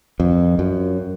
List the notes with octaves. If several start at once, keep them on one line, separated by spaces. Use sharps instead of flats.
F2
F#2